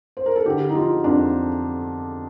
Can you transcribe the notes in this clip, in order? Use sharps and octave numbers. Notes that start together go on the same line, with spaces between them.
C5
A#4
A4
D3 G4
D#4
F3 F4
F2 D4